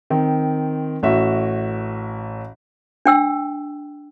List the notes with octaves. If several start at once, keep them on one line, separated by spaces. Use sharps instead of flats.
D#3 C4
A1 F#4 E5
D4 G5 E6